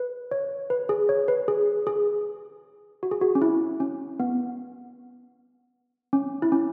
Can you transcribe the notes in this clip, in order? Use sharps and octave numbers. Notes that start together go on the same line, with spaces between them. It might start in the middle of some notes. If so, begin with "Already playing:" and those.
Already playing: B4
C#5
B4
G#4
C#5
B4
G#4
G#4
F#4
G#4
F#4
C#4
E4
C#4
B3
C#4
E4
C#4